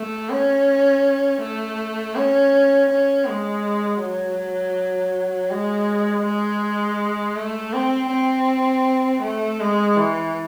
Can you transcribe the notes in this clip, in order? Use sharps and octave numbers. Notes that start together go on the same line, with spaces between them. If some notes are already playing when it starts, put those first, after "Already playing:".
Already playing: A3
C#4
A3
C#4
C#4
G#3
F#3
G#3
G#3
A3
C4
C4
A3
G#3
E3